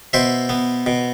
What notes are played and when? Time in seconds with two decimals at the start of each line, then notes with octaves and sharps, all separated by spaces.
0.13 B2 C5 E5
0.49 B3
0.86 B2